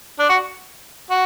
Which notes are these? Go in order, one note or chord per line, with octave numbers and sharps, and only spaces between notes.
D4
F#4
F#4